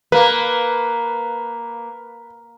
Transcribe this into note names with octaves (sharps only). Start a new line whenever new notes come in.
A#3 B4